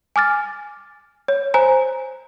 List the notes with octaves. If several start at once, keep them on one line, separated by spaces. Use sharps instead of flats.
G#5 D6 F6 A6
C#5
C5 G#5 A#5